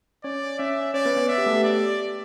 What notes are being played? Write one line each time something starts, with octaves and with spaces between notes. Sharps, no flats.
C#4 C#5 D5
C#4 C#5 E5
C#4 C#5 D5
B3 B4
B3 B4
E5
G4
A3 A4
G4
D5